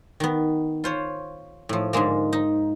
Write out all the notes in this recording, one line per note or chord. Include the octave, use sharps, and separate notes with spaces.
D#3 B3
F4 C5 C#5
A2 F3
G#2 D3 G#3 A#3
D#4